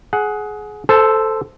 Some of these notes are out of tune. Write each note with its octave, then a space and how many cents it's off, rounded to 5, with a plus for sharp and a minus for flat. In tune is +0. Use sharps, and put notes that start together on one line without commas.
G#4 +20 F#5 +0
A4 +0 C5 -10 A5 -35